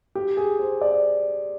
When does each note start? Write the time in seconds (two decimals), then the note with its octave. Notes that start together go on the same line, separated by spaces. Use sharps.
0.15 G4
0.37 G#4
0.59 C5
0.81 D5